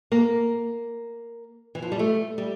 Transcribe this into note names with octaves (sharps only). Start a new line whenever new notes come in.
A#3
E3
F3
G3
A3
G3